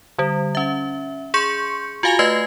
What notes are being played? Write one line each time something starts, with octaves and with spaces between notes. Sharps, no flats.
D3 G3
C#4 E5
G#4 C6 C#6 G6 C#7
F4 F#4 F5 G#5 A6 F7
A3 B4 D#5 G#6 C7